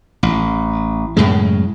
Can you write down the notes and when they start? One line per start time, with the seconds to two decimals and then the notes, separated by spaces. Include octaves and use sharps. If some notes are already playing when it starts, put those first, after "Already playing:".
0.23 A1
1.17 F#2 A2 C#3 G#3